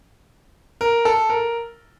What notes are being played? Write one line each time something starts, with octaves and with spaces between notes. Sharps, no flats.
A#4
A4
A#4